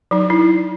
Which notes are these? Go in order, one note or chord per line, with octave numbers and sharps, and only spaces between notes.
F#3 D#4
E4